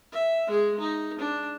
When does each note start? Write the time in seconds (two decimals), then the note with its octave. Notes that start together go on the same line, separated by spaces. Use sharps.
0.12 E5
0.47 G#3 G#4
0.80 D#4
1.19 D4